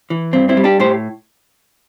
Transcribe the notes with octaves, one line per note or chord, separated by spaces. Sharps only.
E3
G2 C4
C4 E4
G3
D4 G4
A2 G4 C5